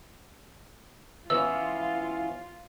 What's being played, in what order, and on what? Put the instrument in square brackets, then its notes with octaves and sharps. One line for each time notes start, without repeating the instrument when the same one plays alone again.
[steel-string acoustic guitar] E3 B3 C#4 [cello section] F4 [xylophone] E6